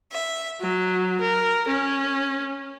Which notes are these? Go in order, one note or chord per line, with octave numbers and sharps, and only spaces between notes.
E5
F#3
A#4
C#4